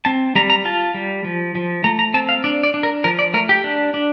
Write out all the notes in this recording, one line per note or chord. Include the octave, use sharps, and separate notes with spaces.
C4 A5
G3 A#5
A#5
F4 A5
G3
F3
F3
A3 A#5
A#5
C4 A5
F5
D4 D5
D5
D4
A#4
F3 A#4
D5
A3 A#4
G4
D4
D4